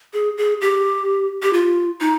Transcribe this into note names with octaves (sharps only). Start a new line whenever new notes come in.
G#4
G#4
G4
G4
F4
D#4